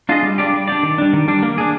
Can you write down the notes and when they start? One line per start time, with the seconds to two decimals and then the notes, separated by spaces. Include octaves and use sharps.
0.09 D4 F4 G#4 D#5
0.23 G3
0.38 D4 G4 D5
0.53 G3
0.68 D4 G4 D5
0.83 D#3
0.98 G3 D4
1.13 D#3
1.28 G3 D4
1.43 A#3
1.58 D4 G#4